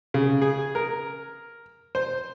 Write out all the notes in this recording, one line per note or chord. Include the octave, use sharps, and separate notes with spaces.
C#3
G#4
A#4
C5